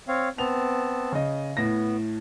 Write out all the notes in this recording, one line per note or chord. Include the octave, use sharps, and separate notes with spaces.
C4 C#5 F5
B3 C4 A5 F7
C#3 D#5
A2 B3 A#6